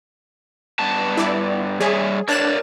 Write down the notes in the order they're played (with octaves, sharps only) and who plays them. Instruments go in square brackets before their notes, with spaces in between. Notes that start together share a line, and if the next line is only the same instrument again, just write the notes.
[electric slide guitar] G2 B3 A5
[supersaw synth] E4 D5
[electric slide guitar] G3 C#5 E5 [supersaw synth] G#4
[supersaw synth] D4 F#6 E7 [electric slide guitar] A#4 C#5 D5